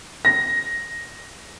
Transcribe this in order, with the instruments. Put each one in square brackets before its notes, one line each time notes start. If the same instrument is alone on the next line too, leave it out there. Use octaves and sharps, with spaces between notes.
[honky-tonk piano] A#6